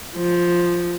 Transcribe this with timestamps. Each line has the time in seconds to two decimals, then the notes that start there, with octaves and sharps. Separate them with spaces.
0.16 F3